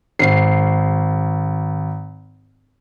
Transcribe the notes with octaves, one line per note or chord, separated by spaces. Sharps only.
G#1 C7